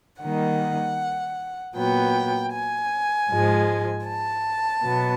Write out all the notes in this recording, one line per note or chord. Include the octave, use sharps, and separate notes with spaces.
D#3 G3 A#3 D#4 F#5
A#2 F#3 B3 G5
G#5
G#2 F3 G#3
A5
B2 F#3 B3